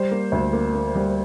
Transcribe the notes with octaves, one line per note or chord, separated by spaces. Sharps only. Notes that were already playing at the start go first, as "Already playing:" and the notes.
Already playing: G3 C5
A#3
D2
A#3
A#3
G3